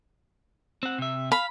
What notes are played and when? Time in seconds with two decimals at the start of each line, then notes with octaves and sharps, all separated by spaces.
0.83 C4 F#5
0.99 C3 E5
1.32 F5 B5